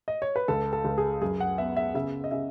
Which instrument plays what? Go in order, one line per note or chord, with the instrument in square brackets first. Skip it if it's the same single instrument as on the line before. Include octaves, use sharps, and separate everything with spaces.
[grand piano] D#5
C#5
B4
C#2 A4
A4
C#2
G#4
F#2 G#4
F#5
B3 E5
E5
C#3 E5
D#5
C#3 E5